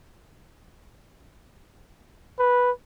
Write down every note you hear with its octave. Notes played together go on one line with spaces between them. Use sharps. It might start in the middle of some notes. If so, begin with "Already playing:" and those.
B4